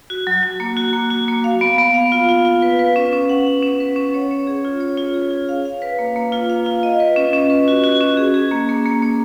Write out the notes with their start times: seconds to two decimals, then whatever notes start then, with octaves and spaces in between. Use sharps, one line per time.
0.10 F#4
0.27 F#3
0.43 F#4
0.60 A#3
0.77 F#4
0.93 A#3
1.10 F#4
1.28 A#3
1.44 F5
1.61 B3
1.78 B3
1.94 F5
2.12 F4
2.29 F4
2.45 F4
2.62 B4
2.79 B4
2.96 C#4
3.13 C#4
3.29 F#5
3.46 F#5
3.63 C#4
3.80 B4
3.96 C#4
4.14 C#5
4.31 C#5
4.47 G#4
4.65 F4
4.80 C#5
4.98 F4
5.14 G#4
5.31 F4
5.49 F5
5.65 F5
5.82 B4
5.99 A#3
6.16 A#3
6.32 F4
6.50 F5
6.66 F4
6.83 D#5
7.00 B4
7.16 C#4
7.33 C#4
7.50 B4
7.68 F#4
7.84 F#4
8.01 C#4
8.17 G#4
8.34 G#4
8.51 A#3
8.69 A#3
8.86 A#3
9.02 A#3